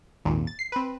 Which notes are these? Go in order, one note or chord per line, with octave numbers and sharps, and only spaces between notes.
G#1 D#2 A#2
A6
C7
C4 B4